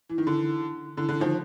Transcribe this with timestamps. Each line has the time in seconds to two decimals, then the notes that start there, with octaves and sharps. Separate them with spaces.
0.09 E3
0.18 D#3
0.27 D3 E3
0.97 D3 E3
1.09 D3 E3
1.20 D#3 F3